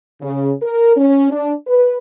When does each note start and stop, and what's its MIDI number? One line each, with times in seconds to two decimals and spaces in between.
0.21 0.52 49
0.62 0.96 70
0.97 1.30 61
1.31 1.53 62
1.67 1.96 71